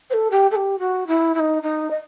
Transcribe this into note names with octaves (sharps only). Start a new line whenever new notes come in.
C5
A4
G4
A4
G4
F#4
E4
E4
D#4
D#4
D#5